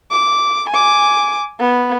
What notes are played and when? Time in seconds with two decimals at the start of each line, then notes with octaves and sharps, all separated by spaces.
0.12 D6
0.70 G#5 D6
1.60 B3